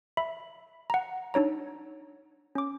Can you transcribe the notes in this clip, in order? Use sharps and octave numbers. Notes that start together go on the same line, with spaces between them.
E5 B5
F#5 A#5
D4 D#4 C#5 A#5
C#4 D6